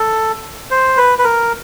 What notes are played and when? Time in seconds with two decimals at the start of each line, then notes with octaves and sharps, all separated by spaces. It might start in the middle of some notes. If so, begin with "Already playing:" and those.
Already playing: A4
0.71 C5
0.97 B4
1.19 B4
1.24 A#4